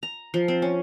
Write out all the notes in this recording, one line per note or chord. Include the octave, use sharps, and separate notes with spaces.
A#5
F3
C4
C#4